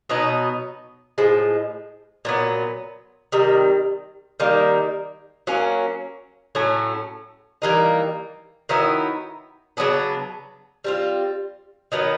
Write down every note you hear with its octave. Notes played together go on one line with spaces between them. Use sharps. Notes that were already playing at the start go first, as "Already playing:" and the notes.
B2 F#3 B3 D#4
A2 F3 G#3
A#2 F#3 B3
C3 D#3 G3
D#3 G3 A#3
F#3 A#3 C#4
A2 F#3 A3 C#4
E3 G3 A#3 D#4
D#3 F#3 B3 E4
C#3 F#3 B3 D4
G3 C4 F4
D#3 F#3 B3